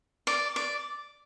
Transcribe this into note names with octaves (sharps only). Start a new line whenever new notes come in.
D5
D5